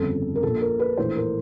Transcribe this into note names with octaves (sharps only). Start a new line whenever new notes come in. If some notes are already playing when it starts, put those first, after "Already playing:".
Already playing: G1 F2 C#3 A4
A#4
A#1 A#2 A4
A#4
B4
A#1 A2 E3 C5
A#4